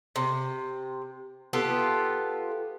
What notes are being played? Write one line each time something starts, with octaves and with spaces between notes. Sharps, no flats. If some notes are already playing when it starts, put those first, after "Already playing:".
C3
B3 F4 G4 A4